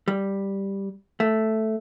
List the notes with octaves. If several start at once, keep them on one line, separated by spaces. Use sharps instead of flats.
G3
A3